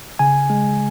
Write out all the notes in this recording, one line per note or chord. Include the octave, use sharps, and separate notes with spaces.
C#3 G#5
G#3